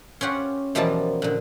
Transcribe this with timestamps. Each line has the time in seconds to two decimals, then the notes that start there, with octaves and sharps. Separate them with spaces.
0.21 C#4 F4 G4 F#5
0.75 B2 E3 F3 G3 A#3 A5
1.22 A#2 D3